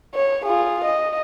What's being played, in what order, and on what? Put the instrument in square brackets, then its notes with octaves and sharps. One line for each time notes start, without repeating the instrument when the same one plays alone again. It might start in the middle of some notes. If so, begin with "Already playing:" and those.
[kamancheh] C#5
F4 G#4
D#5